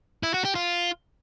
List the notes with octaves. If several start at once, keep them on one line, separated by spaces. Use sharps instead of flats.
E4
F#4
G4
F4